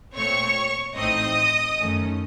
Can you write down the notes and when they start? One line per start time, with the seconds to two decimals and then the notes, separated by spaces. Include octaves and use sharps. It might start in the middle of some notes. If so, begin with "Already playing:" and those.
0.15 A#2 A3 C4 C#5 C#6
0.97 A1 A2 A3 C4 D#4 D#5 D#6
1.79 F#2 D#3 A3 C#4